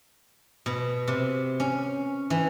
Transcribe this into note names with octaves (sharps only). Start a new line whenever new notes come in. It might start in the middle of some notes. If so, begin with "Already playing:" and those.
B2
C3
C#4
E3